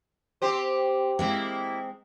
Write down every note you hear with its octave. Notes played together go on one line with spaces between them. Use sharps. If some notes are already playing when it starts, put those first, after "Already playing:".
C4 G4 C5
G#3 A#3 C4 E4